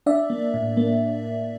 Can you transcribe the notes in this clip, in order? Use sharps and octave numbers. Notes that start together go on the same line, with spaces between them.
D4 D5 E5
A#3
A2
A#3